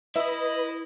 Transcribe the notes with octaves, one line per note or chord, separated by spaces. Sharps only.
E4 B4 D#5 E5 B5